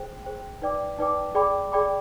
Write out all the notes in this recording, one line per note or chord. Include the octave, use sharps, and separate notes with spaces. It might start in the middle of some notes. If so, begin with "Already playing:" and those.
Already playing: G#4 C5 G5
G#4 C5 G5
D#4 B4 D5 G5 D6
D#4 B4 D5 G5 D6
G#4 D5 G5 B5 D6
G#4 D5 G5 B5 D6